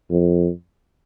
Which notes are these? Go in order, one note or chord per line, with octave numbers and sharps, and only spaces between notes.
F2